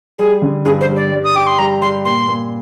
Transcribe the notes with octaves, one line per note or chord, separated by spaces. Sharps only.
G3 G#4
D3
G2 G#4
C5
G3
D5
G3
D#6
G4 D6
C6
G3 A#5
G3 C6
A#2 C6
A#2